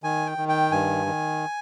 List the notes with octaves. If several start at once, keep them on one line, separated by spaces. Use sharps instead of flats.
D#3 G#5
G5
D#3
G5
G2 G#5
D#3